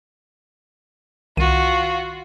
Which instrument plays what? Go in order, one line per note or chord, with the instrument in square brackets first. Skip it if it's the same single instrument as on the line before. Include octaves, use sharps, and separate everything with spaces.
[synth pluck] C2 D#3 D#7 [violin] F4 F#4